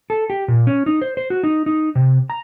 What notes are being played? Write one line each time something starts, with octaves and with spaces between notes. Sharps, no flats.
A4
G4
A#2
C#4
D#4
C5
C5
F#4
D#4
D#4
C3
A#5